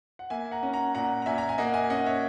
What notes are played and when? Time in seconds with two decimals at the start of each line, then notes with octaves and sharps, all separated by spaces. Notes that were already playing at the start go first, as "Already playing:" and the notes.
0.19 F#5
0.30 A#3 E5 G#5
0.51 F#5 A#5
0.63 C#4
0.73 F#5 A#5
0.95 A#2 F#5 A#5
1.22 A#5
1.26 A#2 E5 G#5
1.38 A#5
1.49 G#5
1.58 A#3 D#5 F#5
1.74 E5 G#5
1.90 C#4 D#5 F#5
2.06 C#5 E5